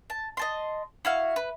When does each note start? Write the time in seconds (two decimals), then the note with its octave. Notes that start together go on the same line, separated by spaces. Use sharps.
0.10 A5
0.37 D#5 A5 C6
1.05 E4 F#4 F5
1.36 B4